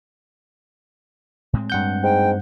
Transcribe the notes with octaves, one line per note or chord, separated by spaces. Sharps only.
A2 G#3 C4
G2 F#5 G6
G#2 G5